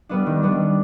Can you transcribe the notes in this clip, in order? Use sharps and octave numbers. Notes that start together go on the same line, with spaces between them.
G3 B3 D4
D#3
G3 B3 D4
B3